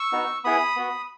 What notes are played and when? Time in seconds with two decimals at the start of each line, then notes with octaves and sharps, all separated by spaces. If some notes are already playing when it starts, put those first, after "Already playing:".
Already playing: C#6 E6
0.12 B3 D#4 F#4
0.44 B3 E4 G#4 B5 D#6
0.76 B3 F#4